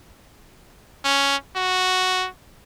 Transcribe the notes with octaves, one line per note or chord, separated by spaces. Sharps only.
C#4
F#4